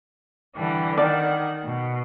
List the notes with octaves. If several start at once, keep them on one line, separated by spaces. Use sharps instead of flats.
D3 E3 G3
D#3 D5 F#5
B2